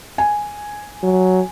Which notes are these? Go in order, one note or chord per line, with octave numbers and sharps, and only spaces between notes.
G#5
F#3